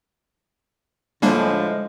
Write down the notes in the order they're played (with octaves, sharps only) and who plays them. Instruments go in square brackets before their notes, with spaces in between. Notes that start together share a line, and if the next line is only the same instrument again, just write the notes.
[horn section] A2 D3 F3 [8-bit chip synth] G3 A#3 D4 [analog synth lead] G#3